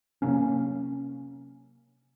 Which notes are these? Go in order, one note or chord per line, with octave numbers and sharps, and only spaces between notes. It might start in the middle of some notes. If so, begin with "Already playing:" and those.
C3 F#3 A#3 C#4